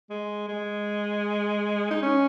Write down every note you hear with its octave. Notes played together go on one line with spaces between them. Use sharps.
G#3
G#3
D#4
C#4